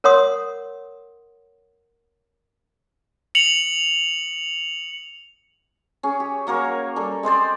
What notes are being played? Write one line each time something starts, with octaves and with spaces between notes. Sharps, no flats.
A#4 C#5 F#5 C6 D#6
C#7 F7 F#7
C#4 G#4
G4
F#3 A#3 A#4 C#5
G3 A4
G#3 C4 C5 D5